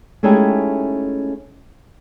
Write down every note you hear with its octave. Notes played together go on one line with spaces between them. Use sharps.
G#3 A3 C#4 D#4 E4 G4